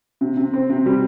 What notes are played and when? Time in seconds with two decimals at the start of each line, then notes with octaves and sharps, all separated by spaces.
0.21 C3
0.37 C3
0.54 C4
0.70 C3
0.86 G3